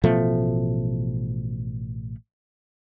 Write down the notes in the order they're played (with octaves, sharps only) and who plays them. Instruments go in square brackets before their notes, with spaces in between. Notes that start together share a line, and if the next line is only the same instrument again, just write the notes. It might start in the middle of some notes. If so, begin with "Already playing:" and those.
[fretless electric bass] A1 B2 F3 A3